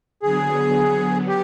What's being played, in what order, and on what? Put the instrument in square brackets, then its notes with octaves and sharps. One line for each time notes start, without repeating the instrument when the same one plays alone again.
[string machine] D3 F#3 B3 [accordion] G#4
[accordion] G4